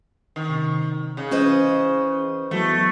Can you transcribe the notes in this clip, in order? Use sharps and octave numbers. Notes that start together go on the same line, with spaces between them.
D#3
C3
C#3
E3 C#4 B4 C5 D#5
E3 F#3 A3 B3